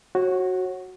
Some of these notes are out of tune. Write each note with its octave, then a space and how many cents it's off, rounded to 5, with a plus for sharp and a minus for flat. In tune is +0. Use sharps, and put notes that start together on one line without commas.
F#4 +0 C#5 -35